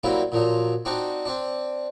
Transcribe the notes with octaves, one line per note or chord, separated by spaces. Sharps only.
F#3 G3 A#3 C4 E4
A#2 F3 F#3
C4 D4 D#4 F#4
C4 D4